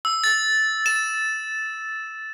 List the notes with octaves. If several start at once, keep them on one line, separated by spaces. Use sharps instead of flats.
E6
A6
E7